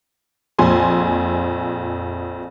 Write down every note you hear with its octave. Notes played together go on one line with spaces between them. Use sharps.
A#1 F2 G#5 C6